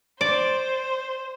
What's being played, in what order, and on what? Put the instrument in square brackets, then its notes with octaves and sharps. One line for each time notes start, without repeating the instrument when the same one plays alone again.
[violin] C5 [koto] D5